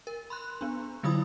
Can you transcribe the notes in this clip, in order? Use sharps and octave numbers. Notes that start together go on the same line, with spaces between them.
A#4
B5 C6 F#6
B3 D4
D3 F#3 E4 F4 B5 D#6